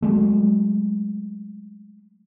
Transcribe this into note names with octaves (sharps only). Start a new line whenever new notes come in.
F#3 G#3 A3